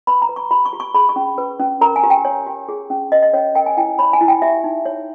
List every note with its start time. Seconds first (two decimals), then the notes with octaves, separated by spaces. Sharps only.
0.07 B4 B5
0.22 A#5
0.29 B4
0.36 C#6
0.51 G4 B5
0.65 C#6
0.73 G4
0.80 C#6
0.94 G#4 B5
1.09 C#6
1.16 C#4
1.38 B4
1.60 C#4
1.81 A#4 A#5
1.96 G#5
2.03 G4
2.10 G5
2.25 C#5
2.47 G4
2.69 G#4
2.90 C#4
3.12 B4 D#5
3.23 D#5
3.33 C#4 C#5
3.55 A#4 G5
3.66 G#5
3.77 E4 G5
3.99 C#5 B5
4.13 G#5
4.21 E4
4.28 G5
4.42 G4 E5
4.64 D#4
4.86 C#5